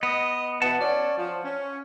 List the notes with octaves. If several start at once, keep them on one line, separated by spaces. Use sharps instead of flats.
B3 D#5
B2 E3 B3 F#5 A5
C#4 C#5 D5
F3
C#4